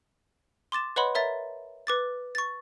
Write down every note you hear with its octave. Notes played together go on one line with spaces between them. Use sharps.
C6 D6 A6 E7
B4 C#5 D#5 F#5 B5 C6
A#4 C#5 E5 A#5 A6
B4 D6 A6
C#6 A6